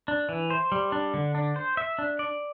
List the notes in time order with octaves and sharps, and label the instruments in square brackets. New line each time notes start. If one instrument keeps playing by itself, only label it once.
[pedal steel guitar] D4
E3
C5
G3
D4
D3
D4
C5
E5
D4
D5